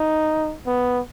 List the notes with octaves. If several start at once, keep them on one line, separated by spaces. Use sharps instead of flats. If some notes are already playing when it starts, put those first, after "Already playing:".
Already playing: D#4
B3